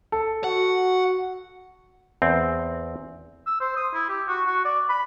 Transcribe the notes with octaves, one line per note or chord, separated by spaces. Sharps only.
A4
F#4 F#5
E2 C4
E6
C5
D#6
E4
G4
F#4
F#4
D5
B5